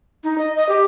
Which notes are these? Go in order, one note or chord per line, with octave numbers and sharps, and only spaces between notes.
D#4
D#5
D#5
G4